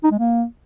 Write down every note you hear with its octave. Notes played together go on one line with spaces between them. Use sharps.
D#4
G#3
A#3